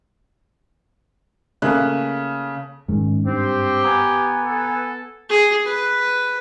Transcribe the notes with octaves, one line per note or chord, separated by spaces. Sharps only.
C#3 A3 A#3 F#6
G#2 D#3 G#3 C#4
G2 C4 G4
B3 G#5 A#5 D#6
A4
G#4
B4